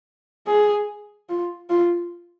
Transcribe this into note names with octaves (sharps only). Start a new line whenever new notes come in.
G#4
F4
F4